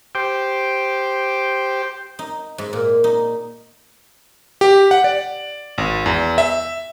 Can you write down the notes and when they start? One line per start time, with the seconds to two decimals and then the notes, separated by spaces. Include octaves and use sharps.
0.15 G4 C5 G5 D6
2.19 D#4
2.58 G#2
2.73 A#2
3.04 D#4
4.61 G4
4.91 F#5
5.04 D5
5.78 G#1
6.06 E2
6.38 E5